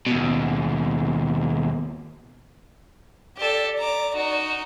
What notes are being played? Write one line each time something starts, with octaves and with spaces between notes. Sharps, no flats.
D#2 B2
G4 A4 D5
A#5 D6
D#4 F#4